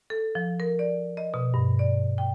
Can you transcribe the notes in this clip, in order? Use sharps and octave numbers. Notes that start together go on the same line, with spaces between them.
A4
F3
A#4
D5
D#5
B2
G2
D5
G5